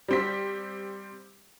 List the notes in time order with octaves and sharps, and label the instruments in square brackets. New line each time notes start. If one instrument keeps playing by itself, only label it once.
[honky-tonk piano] G3 C4 B6